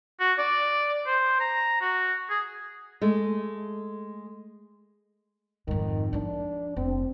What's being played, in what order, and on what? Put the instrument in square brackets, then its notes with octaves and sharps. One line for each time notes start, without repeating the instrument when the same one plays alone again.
[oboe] F#4
D5
C5
A#5
F#4
G#4
[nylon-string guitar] G#3 A3
[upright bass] F2 G#2 [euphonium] D#3
[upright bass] F3 D#4 [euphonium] D4
[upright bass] F1 [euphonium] C4